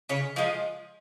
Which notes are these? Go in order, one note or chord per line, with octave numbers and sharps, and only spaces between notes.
C#3 C#5
F3 G#3 F4